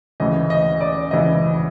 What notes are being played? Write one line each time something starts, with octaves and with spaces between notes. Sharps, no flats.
D2 C#3 E3 D#5
D#5
D5
D2 C#3 E3 D#5